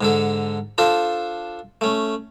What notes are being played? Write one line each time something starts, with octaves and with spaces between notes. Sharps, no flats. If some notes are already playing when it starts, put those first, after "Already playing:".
G#2 D3 A4
D4 F4 A4 C5 A5
A3 C#4